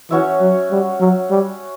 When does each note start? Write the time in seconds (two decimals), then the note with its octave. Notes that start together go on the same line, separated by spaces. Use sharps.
0.10 E3 C#4 F#4 C#5 E5
0.41 F#3
0.71 G3
1.00 F#3
1.30 G3